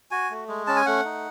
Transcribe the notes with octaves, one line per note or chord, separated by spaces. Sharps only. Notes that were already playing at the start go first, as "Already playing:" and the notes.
F#4 G#5
A3
G#3
C#4 A5
G#5
A3 F#5
D#4